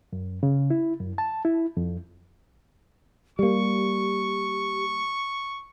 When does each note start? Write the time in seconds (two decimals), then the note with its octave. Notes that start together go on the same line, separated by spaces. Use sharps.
0.13 F#2
0.43 C#3
0.70 E4
1.00 F#2
1.18 A5
1.45 E4
1.77 F2
3.39 G3 A#3 G4 C#6